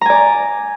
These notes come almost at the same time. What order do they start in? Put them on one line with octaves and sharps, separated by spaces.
A#5 G#5 D5